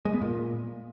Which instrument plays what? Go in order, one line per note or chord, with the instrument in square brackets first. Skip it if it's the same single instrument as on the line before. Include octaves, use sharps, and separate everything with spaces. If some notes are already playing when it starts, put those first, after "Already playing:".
[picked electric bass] G#3
B3
A#2